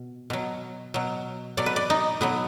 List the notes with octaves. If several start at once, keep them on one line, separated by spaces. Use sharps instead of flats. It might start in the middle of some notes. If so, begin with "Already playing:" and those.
Already playing: B2
B2 F#3
B2 F#3
B2 F#3 D5
B4
D5
D#4
B2 F#3 B3